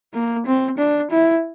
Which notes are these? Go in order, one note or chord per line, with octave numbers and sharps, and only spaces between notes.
A#3
C4
D4
E4